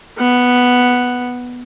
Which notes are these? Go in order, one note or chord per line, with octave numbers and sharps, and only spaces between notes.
B3 F#5